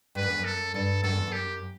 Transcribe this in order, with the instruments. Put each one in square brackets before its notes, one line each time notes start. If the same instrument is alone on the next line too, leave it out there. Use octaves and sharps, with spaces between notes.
[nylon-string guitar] G2 [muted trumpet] B4
[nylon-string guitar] F#2
E2
F#2
[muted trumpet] A4
[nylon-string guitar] G2 [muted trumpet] A4
[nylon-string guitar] F#2 [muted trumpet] A4
[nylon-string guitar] E2
F#2
[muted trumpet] G4